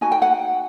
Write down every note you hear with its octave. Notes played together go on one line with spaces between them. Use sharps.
D#4 F#4 G#5
G5
F#5